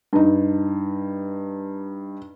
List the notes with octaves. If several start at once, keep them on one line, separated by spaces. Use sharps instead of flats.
G2 D#4